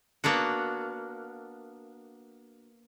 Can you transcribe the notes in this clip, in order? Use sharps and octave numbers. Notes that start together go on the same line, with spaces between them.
A#3 B3 D4 F#4